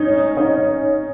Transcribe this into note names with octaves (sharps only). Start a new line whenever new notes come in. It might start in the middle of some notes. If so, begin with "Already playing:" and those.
Already playing: C#4 D#4
C#4 D#4